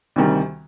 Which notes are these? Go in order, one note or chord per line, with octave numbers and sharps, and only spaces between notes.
D2 C3 D#3 G3